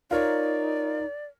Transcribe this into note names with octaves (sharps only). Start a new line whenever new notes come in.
D#4 F4 A#4 C#5 D5